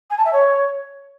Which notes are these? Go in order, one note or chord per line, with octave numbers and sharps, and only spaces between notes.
G#5
A5
E5
C#5